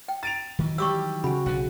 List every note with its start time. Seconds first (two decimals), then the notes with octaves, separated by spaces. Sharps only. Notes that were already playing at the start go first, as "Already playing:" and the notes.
0.08 G5
0.23 A#5 A6 D7 F7
0.59 D#3 E3 F#3
0.78 G3 G4 C#6 D6 E6
1.24 C#3 F#4 G#5 B5
1.46 B1 D3 F#5